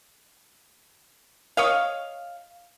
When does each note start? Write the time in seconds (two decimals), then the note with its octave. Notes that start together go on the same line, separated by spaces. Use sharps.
1.57 C#5 D#5 F5